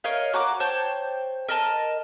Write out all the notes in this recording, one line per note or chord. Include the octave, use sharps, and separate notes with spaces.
A#4 C#5 D#5 F5
F#4 A#5 D6
C5 C#5 G5 A5
A#4 D#5 A5